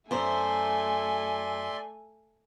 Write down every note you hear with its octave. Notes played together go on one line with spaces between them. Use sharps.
F#2 A3 C5 D5 E5 G#5 C6